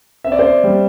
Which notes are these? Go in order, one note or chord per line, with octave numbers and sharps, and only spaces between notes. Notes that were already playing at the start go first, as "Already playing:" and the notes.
C4 E5
D5
C5
D5
G3